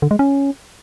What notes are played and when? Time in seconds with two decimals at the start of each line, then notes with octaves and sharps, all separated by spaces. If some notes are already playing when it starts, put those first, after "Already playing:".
0.02 D3
0.11 G#3
0.19 C#4